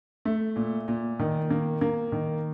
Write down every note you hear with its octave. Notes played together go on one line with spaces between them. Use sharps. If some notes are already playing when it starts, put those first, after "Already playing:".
A3
A#2
A#2
D#3
A#3
A#3
D#3